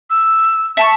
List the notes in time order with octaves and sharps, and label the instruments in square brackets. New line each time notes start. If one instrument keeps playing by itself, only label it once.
[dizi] E6
[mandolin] E5 A5 C#6